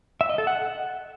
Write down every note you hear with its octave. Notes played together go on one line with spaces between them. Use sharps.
E5
D#5
A4
F#5